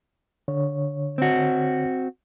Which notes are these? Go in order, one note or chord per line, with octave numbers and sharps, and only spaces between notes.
D3 C#5
C4 F#4